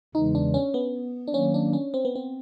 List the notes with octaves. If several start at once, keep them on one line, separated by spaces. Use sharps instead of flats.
E2 C#3 E3 G#3 D#4
D4
C#4
B3
D4
D#3 F#3 A#3 C#4
D4
C#4
C4
B3
C4